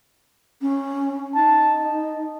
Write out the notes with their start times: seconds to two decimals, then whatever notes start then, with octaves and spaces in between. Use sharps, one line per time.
0.61 C#4
1.35 D#4 A5
1.84 D#5